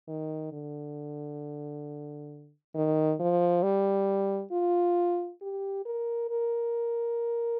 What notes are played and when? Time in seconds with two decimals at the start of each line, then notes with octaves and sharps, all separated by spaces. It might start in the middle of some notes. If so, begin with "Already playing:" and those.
0.08 D#3
0.52 D3
2.75 D#3
3.20 F3
3.63 G3
4.52 F4
5.42 G4
5.86 A#4
6.30 A#4